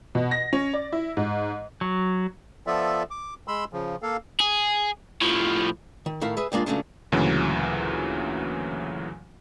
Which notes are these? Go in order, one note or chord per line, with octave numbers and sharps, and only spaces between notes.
B2
A#6
C#4
D5
E4
G#2
F#3
F3 B3 F4 A4 D5 E5
D6
G#3 B5 C6 E6
C#3 F3
A#3 A4 F5
G#4
A2 F3
D#3
A2 D#3 E4 A#4 F5
G#4 B4 E5
C2 G#3 A#3 D4 F4
C#2 C#3 F#3 A3 C#4 D4
D2 A#2 C#3 E3 F#3